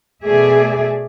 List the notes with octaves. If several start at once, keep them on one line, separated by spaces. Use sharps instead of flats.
B2 A3 G#4 D5 E5